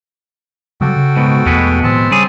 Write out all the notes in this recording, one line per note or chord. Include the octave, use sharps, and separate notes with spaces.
C#3 F#3 G3 F#4 A4 G5
C#3
G#2 B2
E2 B2 F3 G#3 A3 B3
A2 D#3 F3 C4 A5
C#3 G3 G#4